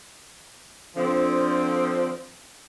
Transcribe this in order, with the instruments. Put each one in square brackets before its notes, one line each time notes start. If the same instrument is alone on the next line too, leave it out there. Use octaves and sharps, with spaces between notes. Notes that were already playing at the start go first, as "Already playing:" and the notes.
[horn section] D3 F3 C4